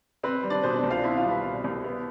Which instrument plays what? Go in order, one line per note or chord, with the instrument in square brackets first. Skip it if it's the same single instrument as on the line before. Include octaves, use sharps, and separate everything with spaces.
[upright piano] C4 B4
G3
D4 D5
B2 C5
D4 D5
C2
F4 F5
C4 E4 E5
F4 F5
G3
B4 B5
B2
C2
B3